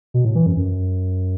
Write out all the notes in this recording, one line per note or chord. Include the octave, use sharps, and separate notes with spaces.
B2
A2
E3
F#2
F#2